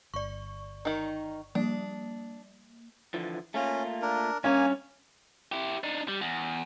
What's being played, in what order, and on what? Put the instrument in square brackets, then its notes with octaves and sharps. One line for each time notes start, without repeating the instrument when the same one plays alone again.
[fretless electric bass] G1 [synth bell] D5 C#6
[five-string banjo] D#3 D#4
[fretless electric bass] F3 G3 [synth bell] A#3 [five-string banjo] D4
[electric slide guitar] D3 E3 F3
[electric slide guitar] A3 A#3 F4 [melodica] C#4
[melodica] D4 A#4
[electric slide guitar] G2 C#5 [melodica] A#3 G#5 [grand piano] C#4
[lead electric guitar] E4 G4
D4 D#4
G3
E2